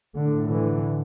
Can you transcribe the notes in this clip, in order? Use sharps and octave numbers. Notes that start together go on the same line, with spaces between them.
A2 D3
D3 E3